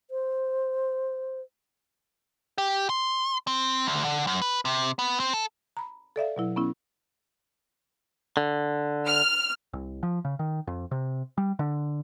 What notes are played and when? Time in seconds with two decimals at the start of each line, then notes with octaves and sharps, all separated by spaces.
0.11 C5
2.58 G4
2.90 C6
3.47 C4
3.87 D2
4.04 D3
4.27 F#2
4.42 B4
4.65 C3
4.99 B3
5.20 C4
5.34 A4
5.77 A#5 B5
6.16 A4 D5 E5 F5
6.36 B2 F#3 E4
6.56 B3 C#4 E4
8.37 D3
9.06 F6
9.73 C2
10.03 F3
10.25 C#3
10.39 D#3
10.67 F2
10.91 C3
11.38 G3
11.59 D3